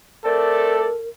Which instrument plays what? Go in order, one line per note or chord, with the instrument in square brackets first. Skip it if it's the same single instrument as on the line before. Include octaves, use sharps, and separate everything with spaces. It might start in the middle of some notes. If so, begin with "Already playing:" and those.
[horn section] A3 C4 D5 [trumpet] A4 [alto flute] A#4